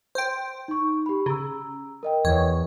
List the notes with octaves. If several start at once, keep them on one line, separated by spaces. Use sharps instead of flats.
C5 G5
D#4 C#6
G4 B5
C#3 A#5 E6
A#4 D#5 G5
E2 C#5